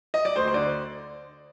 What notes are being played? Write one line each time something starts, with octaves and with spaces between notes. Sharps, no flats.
D#5
D5
D2 C5
C5
D3 D5